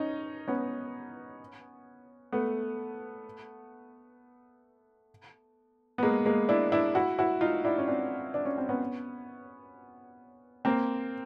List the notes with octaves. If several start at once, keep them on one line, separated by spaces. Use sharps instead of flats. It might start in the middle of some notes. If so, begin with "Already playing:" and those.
Already playing: C#4 D#4
B3 C#4
A3 B3
B3
G#3 A#3
G#3 A#3
D4 E4
D4 E4
E4 F#4
E4 F#4
D#4 F4
D4 E4
C#4
C4 D4
D4
C#4
C4
B3 C#4
A#3 C4